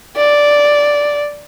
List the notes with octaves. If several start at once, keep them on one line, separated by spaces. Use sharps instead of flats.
D5